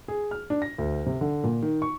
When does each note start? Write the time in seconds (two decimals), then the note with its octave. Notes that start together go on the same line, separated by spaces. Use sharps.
0.08 G#4
0.31 F6
0.50 D4
0.62 A#6
0.78 D2
1.06 C3
1.21 D3
1.44 A#2
1.62 D#3
1.82 C#6